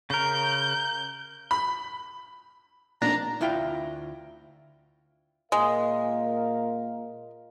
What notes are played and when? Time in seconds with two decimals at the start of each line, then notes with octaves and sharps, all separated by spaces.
0.10 C#3 A#4 G6
1.51 B5
3.02 F1 A#2 D4 A#5
3.41 D2 E4 F4 G5
5.52 A#2 G#3 A#4 F5